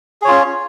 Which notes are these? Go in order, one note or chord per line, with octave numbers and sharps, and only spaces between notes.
C#4 F4 G#4 C#5